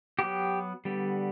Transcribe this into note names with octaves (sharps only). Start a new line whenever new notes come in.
F#3 B3 G4
D3 G3 B3